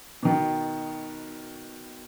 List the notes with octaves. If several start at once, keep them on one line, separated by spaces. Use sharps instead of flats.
B2 D#3